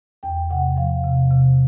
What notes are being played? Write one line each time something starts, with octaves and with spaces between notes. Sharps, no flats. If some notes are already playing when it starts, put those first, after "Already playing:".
E2 G5
C3 F#5
F3 F5
C3
C3